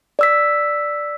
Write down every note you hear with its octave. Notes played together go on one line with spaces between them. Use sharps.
D5 E6 B6